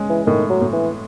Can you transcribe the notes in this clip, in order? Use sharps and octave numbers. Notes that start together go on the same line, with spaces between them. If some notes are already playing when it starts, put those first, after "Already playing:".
Already playing: G#3 C#4
E3
A2 D#3
F#3
A2
E3